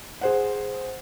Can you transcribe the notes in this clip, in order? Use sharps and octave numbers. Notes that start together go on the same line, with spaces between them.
G#4 C5 F#5